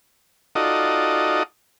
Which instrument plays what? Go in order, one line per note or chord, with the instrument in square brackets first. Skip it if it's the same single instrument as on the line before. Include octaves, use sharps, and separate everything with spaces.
[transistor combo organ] D#4 F4 F#4 A4 D5 D#5